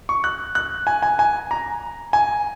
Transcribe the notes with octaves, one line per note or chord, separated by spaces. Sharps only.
C#6
F#6
F#6
G#5
G#5
G#5
A#5
G#5